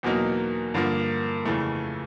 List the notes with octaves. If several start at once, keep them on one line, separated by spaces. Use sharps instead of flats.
E2 B2 F#3 A#3 D#4
G2 D3 F3 A#3
F2 C#3 E3 A3